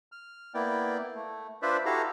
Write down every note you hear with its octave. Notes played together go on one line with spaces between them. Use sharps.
F6
A#3 B3 E4 D5 G5
A3
D4 F4 B4 C5 D5 E5
E4 F#4 G4 A4 F5 A#5